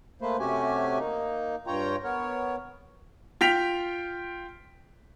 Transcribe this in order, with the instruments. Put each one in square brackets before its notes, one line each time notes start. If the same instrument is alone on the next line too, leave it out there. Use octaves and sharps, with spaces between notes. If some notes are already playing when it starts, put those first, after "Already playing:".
[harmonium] A3 A#3 B4 C5
C3 A3 C#4 F#4 G4 G#5
A#3 D#4
G2 F4 C#5 G5 A#5
B3 A#4 C#5
[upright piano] F4 G5 B6 F7